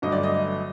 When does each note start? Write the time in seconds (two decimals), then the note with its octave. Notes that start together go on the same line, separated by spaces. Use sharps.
0.02 G1 G2 F#3 A3 D#5
0.12 D5
0.23 D#5